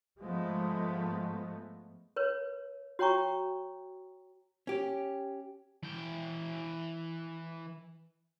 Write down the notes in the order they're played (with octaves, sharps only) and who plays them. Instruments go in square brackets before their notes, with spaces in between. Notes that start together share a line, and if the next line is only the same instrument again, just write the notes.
[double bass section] G#2 F3 G#3 A3 B3
[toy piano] A#4 B4 C#5
F#4 C#5 G5 A#5 C#6
[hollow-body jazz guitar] C#4 G4
[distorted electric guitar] E3 G5